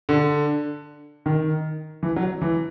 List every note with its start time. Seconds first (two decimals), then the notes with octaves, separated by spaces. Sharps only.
0.09 D3
1.26 D#3
2.03 E3
2.16 F#3
2.42 E3